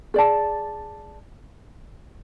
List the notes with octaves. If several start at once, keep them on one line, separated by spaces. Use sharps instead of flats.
G#4 D5 A5